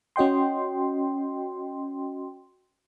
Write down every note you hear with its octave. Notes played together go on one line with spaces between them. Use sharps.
C#4 F#4 D#5 G5 C6